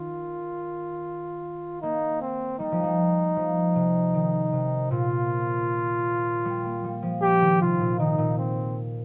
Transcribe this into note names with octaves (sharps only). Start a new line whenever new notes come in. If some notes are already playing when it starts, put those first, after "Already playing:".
Already playing: D#3 F4
A#3 D#4
C4
G3 D#4
F3
G3
F3
C3
D#3
C3
A#2 F4
G3
A#3
G3
F3
G4
D#3
C3 F4
A#2
D#3 D#4
A#2
C4